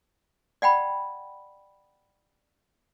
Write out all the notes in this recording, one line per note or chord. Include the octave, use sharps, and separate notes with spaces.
D5 F#5 G5 B5